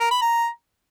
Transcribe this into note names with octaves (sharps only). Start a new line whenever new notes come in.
A#4
B5
A#5